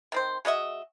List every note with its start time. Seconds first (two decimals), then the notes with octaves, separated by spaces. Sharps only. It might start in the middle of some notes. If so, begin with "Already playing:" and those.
0.12 D#3 C4 C5
0.45 G#3 F#4 D#5 E5